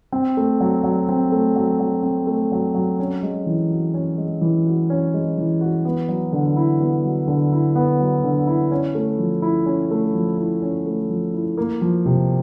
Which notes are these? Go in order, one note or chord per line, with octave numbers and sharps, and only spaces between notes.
C4
A3
F#3
F#3
C4
A3
F#3
F#3
C4
A3
F#3
F#3
C#4
G#3
E3
F#4
C#4
G#3
E3
F#4
C#4
G#3
E3
F#4
B3
F#3
D3
E4
B3
F#3
D3
E4
B3
F#3
D3
E4
C#4
A3
F3
E4
C#4
A3
F3
E4
C#4
A3
F3
E4
A#3
F3
C3